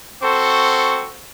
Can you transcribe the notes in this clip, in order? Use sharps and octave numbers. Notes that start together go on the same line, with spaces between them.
C4 F#4 A4 C5 C#6